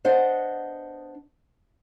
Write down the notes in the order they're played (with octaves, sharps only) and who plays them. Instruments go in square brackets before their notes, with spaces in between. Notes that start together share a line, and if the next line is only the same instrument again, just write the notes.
[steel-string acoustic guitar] B3 D4 C5 D#5 F#5